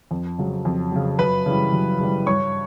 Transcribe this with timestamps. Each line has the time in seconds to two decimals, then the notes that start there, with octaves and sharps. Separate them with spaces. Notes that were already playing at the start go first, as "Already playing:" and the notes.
0.11 F2
0.38 C#3 F#3
0.65 F2
0.92 C#3 F#3
1.19 F#2 B4 B5
1.46 C#3 E3 G3
1.73 F#2
2.00 C#3 E3 G3
2.26 G2 C#5 C#6